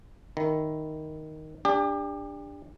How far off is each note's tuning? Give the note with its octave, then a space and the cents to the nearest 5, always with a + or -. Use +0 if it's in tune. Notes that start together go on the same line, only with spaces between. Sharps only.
D#3 +0 E4 +0
D4 +0 G4 +35